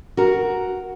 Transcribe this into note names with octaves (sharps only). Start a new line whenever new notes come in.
F#4 A#4